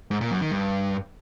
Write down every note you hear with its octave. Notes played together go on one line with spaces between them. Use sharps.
G#2
A#2
F#2
D#3
G2